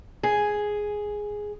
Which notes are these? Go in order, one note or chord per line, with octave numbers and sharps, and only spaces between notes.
G#4